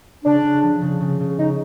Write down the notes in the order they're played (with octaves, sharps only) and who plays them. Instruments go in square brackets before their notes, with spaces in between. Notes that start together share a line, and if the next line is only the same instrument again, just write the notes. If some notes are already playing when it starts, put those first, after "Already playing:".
[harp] C#3 [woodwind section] D4
[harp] C#3
F3
C#3
C#3
C#3
[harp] C#3 [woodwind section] D#4